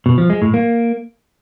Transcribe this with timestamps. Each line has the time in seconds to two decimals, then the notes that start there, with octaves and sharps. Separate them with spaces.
0.06 B2
0.18 F3
0.30 G#3
0.42 A2
0.54 A#3